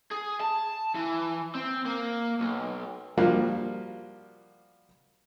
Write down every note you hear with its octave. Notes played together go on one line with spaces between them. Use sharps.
G#4
A5
E3
C4
A#3
B1
F3 G3 A#3 F4 F#4